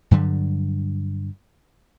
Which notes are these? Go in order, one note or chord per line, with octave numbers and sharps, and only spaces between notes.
G2 D3 F#3 G3